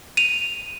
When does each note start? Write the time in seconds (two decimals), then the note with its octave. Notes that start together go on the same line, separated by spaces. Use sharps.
0.17 D#7 F7